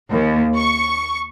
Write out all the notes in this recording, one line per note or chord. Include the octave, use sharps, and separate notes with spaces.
D#2
C#6